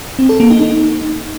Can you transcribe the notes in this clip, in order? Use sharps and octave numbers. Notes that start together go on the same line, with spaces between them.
C4
A4
A#3
D#4
D#4